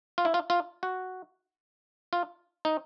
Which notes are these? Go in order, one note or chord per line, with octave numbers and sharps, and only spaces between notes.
F4
E4
F4
F4
F#4
F4
D#4